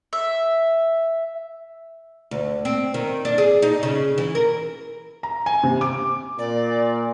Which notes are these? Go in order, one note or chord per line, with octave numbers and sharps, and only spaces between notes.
E5
D2
C4
D#3
D4
G#4
D#4
C#3
E3
A#4
A#5
G#5
C3
D6
A#2 D5